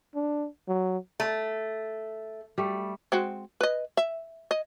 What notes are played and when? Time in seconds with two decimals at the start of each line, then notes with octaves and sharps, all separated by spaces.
0.15 D4
0.68 F#3
1.20 A3
2.58 G3 A3
3.12 G#3 C4 F#4
3.61 B4 D#5
3.97 E5
4.51 D#5